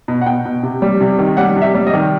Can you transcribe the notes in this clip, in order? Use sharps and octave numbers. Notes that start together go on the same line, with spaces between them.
B2
F#5
B2 G5
B2
C3
G3
C3
D#3
G3 F#5
C3
E5
G3
D#5
D#3